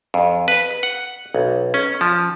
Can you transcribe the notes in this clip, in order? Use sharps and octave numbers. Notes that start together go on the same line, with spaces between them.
F2
B4
F#5
B1
C#4
F3